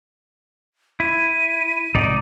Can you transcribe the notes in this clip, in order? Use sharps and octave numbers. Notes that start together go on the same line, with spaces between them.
E4 D#7
G#2 C3 D#4 D5